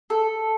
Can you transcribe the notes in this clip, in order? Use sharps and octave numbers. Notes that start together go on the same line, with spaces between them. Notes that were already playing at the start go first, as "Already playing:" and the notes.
A4